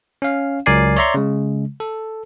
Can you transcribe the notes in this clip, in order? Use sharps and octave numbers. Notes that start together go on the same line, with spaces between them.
C#4 F5
C#2 F#3 A#4 D5 G#5 C7
C#5 D5 E5 A#5 C6 C#6
C#3 G#3
A4